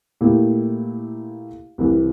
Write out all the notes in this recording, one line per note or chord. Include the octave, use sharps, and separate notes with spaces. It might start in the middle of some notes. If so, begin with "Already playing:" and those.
A#2 A3 E4 G4
C2 C3 E3